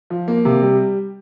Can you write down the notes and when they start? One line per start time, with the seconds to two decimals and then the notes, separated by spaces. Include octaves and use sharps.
0.10 F3
0.28 A#3
0.45 C3
0.62 G3